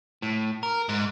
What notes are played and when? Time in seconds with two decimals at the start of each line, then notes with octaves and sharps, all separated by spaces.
0.22 A2
0.63 A#4
0.89 G#2